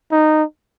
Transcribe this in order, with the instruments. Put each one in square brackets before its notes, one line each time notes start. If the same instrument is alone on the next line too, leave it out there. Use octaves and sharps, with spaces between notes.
[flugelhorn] D#4